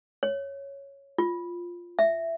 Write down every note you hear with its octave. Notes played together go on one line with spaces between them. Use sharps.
C#5
F4
E5